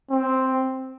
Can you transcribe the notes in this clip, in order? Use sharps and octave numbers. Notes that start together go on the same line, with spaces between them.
C4